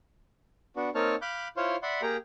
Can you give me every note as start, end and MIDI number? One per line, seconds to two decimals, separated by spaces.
0.76 0.90 59
0.76 0.90 62
0.76 0.90 66
0.95 1.15 58
0.95 1.15 60
0.95 1.15 63
0.95 1.15 73
0.95 1.15 81
0.95 1.15 89
1.22 1.48 77
1.22 1.48 83
1.22 1.48 86
1.22 1.48 90
1.22 1.48 91
1.57 1.76 64
1.57 1.76 65
1.57 1.76 72
1.57 1.76 73
1.57 1.76 77
1.57 1.76 84
1.83 2.01 74
1.83 2.01 76
1.83 2.01 78
1.83 2.01 83
1.83 2.01 84
2.02 2.17 58
2.02 2.17 67
2.02 2.17 68
2.02 2.17 79
2.02 2.17 82